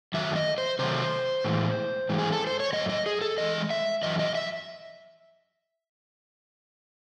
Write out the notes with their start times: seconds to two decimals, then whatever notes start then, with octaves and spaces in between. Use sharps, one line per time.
0.14 F#2 D#3 F#3 A3 E5
0.36 D#5
0.58 C5
0.79 C3 D#3 F#3 A3 C5
1.44 A2 E3 G#3
2.09 G#2 E3 G#3
2.19 G#4
2.32 A4
2.47 C5
2.60 C#5
2.73 F#2 E3 A3 D#5
2.90 D#5
3.06 G#4
3.21 A4
3.38 A2 E3 G#3 D#5
3.70 E5
4.03 F#2 E3 D#5
4.19 D#5
4.35 E5